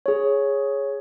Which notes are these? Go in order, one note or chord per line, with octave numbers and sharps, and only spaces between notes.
G#4 C#5